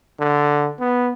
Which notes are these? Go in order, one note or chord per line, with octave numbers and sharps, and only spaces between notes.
D3
B3